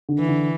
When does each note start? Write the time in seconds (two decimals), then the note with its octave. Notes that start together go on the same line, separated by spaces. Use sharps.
0.09 D3
0.19 E3
0.28 D3